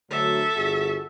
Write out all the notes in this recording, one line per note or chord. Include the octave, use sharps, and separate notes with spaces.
D2 F#3 A4 E5
G1 F#4 G#4